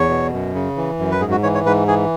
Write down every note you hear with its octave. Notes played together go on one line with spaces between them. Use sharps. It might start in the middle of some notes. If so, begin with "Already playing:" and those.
Already playing: E2 C#5
B2
F#2
C#3
E3
F#2
B4
G#2 G#4
F#4
E3 C#5
C#5
G#2 B4
E3 G#4